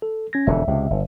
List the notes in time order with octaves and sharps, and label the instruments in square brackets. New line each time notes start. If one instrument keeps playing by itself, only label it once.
[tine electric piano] A4
C#4 G#6 A#6
[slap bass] E1 F2 D3 [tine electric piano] E5
[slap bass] C#2 C3
G1